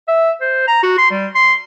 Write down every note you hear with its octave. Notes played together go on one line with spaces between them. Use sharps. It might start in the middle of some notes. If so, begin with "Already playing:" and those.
E5
C5
A#5
F#4
C6
G3
C6